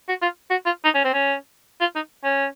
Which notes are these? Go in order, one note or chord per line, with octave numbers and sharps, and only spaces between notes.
F#4
F4
F#4
F4
D#4
C#4
C4
C#4
F4
D#4
C#4